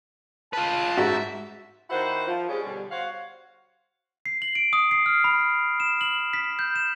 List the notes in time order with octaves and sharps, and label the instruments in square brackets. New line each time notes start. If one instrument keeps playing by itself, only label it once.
[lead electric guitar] F4 B4 [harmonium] A5
[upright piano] G#2 [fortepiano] F#4 [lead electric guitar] E5
[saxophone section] D#3 E4 F#4 C5 F#5
F3
G#3 C#4 D4 G4 G#4
B2 D3 G3
F#4 C5 C#5 F5 F#5
[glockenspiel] C7
F#7
D7
D#6
C7
F6
B5
E7
F#7
B6
G6
E7